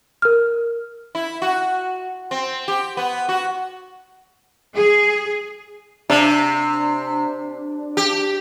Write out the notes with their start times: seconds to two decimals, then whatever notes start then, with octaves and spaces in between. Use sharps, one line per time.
0.22 A#4 F6
1.15 E4
1.42 F#4
2.31 C4
2.68 G4
2.97 B3
3.29 F#4
4.75 G#4
6.10 C3 D4
7.97 G4